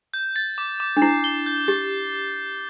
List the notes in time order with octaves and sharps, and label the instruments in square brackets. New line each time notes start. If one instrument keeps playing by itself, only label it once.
[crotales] G6
A6
D6
D6
[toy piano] D4
[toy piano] E4 [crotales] C7
[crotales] G7
G6
[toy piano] G4 [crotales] A6